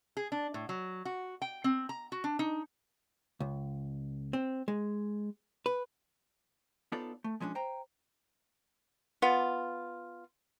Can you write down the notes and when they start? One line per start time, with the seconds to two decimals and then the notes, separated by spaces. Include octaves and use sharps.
0.17 G#4
0.32 D4
0.54 A2
0.69 F#3
1.05 F#4
1.42 G5
1.64 C4
1.89 A#5
2.12 F#4
2.24 D4
2.39 D#4
3.40 C#2
4.33 C4
4.68 G#3
5.66 B4
6.92 B3 D#4 F4 A4 C#5 D5
7.24 A3
7.40 F3 G#3 C#4 D4
7.55 C5 G5 A#5
9.22 B3 F4